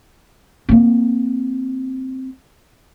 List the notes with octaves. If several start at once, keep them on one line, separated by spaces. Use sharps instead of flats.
A#3 C4